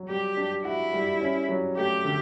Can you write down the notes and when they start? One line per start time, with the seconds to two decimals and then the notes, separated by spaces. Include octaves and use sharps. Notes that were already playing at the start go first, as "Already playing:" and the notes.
Already playing: F#3
0.09 G3 G4
0.37 D4
0.65 E4 F#4
0.93 G3
1.21 C#4
1.49 F#3
1.77 A3 G4
2.04 D3